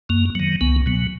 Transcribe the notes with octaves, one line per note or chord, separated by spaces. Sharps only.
F#2 A#3
D#3 F#3
C#2 B3
B2 F#3